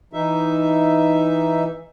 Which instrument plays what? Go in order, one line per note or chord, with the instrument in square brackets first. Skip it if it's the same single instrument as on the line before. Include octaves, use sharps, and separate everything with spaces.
[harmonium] E3 D#4 E5